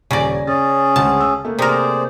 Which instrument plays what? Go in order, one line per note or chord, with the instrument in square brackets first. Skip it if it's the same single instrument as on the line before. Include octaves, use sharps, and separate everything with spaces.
[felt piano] D#1 G#5 A#6 [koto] C#3 D5
[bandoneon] C#4 G#4 [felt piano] A6
[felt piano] D2 G#3 [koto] A5
[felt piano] E6
A3 A#3
[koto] C3 A#4 [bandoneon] G#4 C5 D5